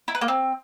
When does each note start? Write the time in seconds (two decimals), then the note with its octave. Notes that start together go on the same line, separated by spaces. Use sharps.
0.08 E4
0.15 B4
0.21 A#3
0.28 C4